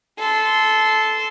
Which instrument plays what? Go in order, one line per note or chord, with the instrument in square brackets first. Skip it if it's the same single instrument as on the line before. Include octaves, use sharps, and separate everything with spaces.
[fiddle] A4 C6